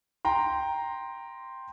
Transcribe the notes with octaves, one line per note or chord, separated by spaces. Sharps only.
G5 A#5 C6